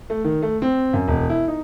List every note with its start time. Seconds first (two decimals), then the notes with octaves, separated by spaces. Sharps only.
0.10 A3
0.24 D#3
0.42 A3
0.62 C4
0.93 F#2
1.08 E1
1.30 E4
1.48 D#4